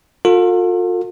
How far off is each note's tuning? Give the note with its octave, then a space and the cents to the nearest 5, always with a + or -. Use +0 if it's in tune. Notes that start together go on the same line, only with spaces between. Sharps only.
F4 +40 A4 +35